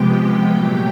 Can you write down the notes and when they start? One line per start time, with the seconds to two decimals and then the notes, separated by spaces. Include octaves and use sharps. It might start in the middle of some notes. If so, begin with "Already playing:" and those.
Already playing: C3 F3 G#3 B3 G4 G5
0.50 A#2 F#3 A3